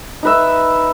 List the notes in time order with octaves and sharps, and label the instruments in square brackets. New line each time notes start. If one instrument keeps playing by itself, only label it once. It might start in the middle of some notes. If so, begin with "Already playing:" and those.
[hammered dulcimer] D#4 B4 E5